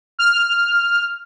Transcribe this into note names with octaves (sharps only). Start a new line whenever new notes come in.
F6